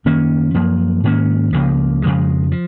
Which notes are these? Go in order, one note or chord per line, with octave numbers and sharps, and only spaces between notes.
F#2 D#3 A#3 C#4
F#2 F3 A#3
G#2 D#3 A#3 C#4
C#2 C#3 F3 A#3
F2 C#3 F3 G#3
F3